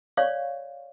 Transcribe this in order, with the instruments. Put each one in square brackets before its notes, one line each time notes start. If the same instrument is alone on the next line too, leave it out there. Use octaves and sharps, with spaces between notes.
[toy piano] C#5 D5 F5 C#6